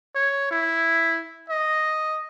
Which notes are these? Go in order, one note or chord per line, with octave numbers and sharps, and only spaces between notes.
C#5
E4
D#5